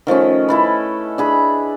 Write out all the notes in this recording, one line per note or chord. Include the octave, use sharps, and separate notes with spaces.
D#3 F3 A3 C#4
E4 A4 B4
D4 G#4 B5